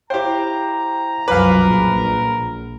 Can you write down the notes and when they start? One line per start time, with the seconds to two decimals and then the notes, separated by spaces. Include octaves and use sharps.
0.10 E4 G4 C5 F5 G5 A#5
1.28 C2 F#2 F3 A#4 B4 F5 G#5 D6
1.70 A#1 A#2 G#4